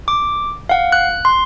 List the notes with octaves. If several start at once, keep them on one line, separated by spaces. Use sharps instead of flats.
D6
F5 F#5
F#6
C6